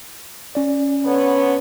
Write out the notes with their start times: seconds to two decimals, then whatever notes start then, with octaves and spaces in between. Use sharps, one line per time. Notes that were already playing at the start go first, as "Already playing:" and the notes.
0.55 C#4 D5
1.04 D3 B3 C#5